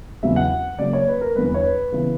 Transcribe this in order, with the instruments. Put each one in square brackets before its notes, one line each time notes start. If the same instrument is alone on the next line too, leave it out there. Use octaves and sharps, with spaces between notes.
[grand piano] E2 C#3 F#3 B3 E5
F#5
C#3 F#3 A#3 D5
C#5
B4
A#4
E2 D3 G3 B4
B4
C#5
B4
C#3 E3 B3